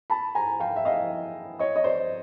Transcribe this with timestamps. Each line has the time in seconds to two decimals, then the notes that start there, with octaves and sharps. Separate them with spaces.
0.10 A5 B5
0.35 G#5 A#5
0.60 F5 G5
0.76 E5
0.85 D#5 F5
1.59 C#5 D#5
1.76 D#5
1.84 C5 D5